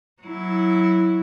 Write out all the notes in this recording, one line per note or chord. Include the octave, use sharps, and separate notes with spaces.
F#3 E4